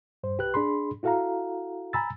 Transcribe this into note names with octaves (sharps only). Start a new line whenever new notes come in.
E2 G2 C5
C2 G4 B4 F#6
D4 G#4 B5 C6
E4 F#4 A4 F5 F#5 A#5
G#5 A#5 B5 E6 A6